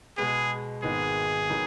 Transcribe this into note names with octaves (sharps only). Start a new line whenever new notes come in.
B2 G#3 B3 G#4
G#1 G#2 D#3 G#3 B3 G#4
D#3 F#3 B3